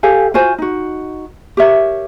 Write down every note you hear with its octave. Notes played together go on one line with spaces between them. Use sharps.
G4 A4 F5 G#5
F4 F#4 C5 G#5
D#4 F#4
G4 A#4 C#5 E5